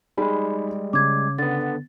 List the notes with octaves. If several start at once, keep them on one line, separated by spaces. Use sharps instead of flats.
G3 G#3 D#4 G#4 B5
C#3 D6 G#6
D3 B3 A6